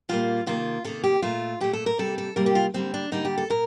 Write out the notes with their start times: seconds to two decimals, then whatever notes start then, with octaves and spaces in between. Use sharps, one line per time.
0.09 A#2 G3 A#3 F4
0.46 C3 D#3 A#3 F4
0.84 C3 D#3 A#3 A4
1.04 G4
1.22 A#2 A3 F4
1.60 A#2 A3 G4
1.73 A4
1.86 A#4
1.98 C3 G3 A#3 A4
2.18 A4
2.36 C3 G3 A#3 A#4
2.46 G4
2.55 F4
2.74 D3 G3 A#3 C4
2.94 D4
3.12 D3 G3 A#3 D#4
3.25 G4
3.38 A4
3.50 A#2 A#4